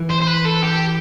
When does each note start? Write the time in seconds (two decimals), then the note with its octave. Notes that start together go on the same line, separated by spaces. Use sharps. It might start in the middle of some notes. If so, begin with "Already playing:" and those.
Already playing: E3
0.10 C5
0.21 C5
0.27 B4
0.45 A4
0.63 G4